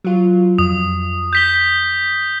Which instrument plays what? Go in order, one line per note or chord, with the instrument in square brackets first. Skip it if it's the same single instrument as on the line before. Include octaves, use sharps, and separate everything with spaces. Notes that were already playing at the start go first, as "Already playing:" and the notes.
[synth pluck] F#3 F4
[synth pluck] F2 [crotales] D#6
[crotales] G6 B6 G7